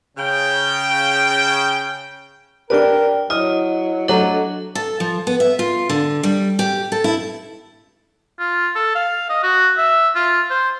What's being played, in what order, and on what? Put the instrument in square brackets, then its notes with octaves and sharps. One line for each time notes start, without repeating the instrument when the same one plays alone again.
[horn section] C#3 G5
[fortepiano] D4 G4 B4 [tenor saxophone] A#4 [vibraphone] D5 G5
[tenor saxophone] F#3 [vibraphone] E4 D#5 [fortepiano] D#6 F6
[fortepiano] F#3 A3 [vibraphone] D4 A4 D#5 [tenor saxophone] F#4
[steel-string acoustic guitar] A4
F3
B3
E5
F4
D3
G3
G4
A4
E4
[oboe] F4
A4
F5
D#5
F#4
E5
F4
C5